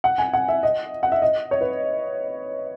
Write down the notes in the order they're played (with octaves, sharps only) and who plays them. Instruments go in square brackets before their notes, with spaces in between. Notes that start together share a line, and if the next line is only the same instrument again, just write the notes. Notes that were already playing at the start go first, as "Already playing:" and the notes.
[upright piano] F#5
G#5
F#5
E5
D#5
F#5
E5
D#5
C#5
B4